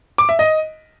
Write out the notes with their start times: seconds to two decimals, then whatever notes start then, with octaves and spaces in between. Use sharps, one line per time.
0.18 D6
0.29 E5
0.39 D#5